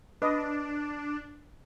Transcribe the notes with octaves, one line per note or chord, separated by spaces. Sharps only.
D4 B4 D#5